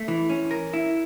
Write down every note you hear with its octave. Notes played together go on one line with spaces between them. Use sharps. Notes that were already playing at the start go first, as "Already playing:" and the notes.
Already playing: A3
E3
C#4
A#4
E4